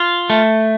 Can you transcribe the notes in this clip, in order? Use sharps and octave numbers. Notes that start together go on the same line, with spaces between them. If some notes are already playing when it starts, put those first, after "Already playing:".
Already playing: F4
A3